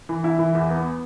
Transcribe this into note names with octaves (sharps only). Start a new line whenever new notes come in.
E3
E4
E3
E2
B3